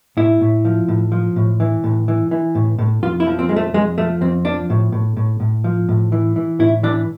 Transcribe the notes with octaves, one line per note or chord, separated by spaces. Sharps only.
A2 E4
A2
F3
A2
F3
A2
E3
A2
E3
E3
A2
A2
F2 F4
E4
F3
C4
F2 G#3
A3
F2 G#3
F3 A3
F2 C4
F3 D4
A2
A2
A2
A2
F3
A2
E3
E3
A2 E4
E3 D4